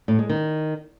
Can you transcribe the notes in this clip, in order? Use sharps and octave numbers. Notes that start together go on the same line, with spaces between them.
A2
G#3
D#3